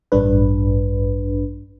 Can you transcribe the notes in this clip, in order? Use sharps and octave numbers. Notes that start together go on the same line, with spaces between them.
A1 G2 D4 B4